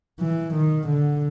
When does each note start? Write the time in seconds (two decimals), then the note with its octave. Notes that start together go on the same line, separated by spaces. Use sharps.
0.20 E3
0.54 D#3
0.87 D3